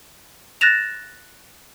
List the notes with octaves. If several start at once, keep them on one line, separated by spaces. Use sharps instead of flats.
F#6 A6 A#6 E7 F7